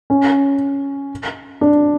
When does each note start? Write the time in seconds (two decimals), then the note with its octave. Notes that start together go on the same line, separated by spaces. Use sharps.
0.10 C#4
1.61 D4